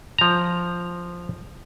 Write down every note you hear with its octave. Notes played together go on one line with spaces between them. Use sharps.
F3 A#5